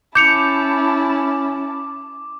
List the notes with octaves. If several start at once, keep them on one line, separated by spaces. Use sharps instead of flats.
C#4 E4 A5 D6 G6 C#7 F7